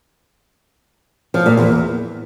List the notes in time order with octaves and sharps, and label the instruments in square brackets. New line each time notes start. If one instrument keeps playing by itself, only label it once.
[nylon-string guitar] F3
A#2
E2